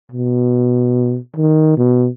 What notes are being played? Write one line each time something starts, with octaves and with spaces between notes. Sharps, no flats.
B2
D#3
B2